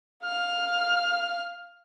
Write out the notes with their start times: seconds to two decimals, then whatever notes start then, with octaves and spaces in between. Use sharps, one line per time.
0.24 F5 F6